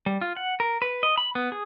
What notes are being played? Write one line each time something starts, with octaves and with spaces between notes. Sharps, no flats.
G3
F4
F#5
A#4
B4
D#5
B5
B3
G#4